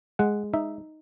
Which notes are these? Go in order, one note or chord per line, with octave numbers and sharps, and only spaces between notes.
G#3 F#5
D#4 E5